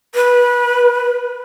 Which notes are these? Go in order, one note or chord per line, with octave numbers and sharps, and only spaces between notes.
B4